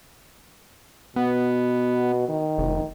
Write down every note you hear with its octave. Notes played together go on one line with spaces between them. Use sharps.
B2 B3
D#3
F1